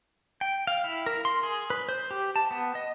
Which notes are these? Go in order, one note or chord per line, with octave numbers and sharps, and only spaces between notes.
G5
F5
E4
A#4
C6
G#4
B4
C5
G4
A5
B3
D#5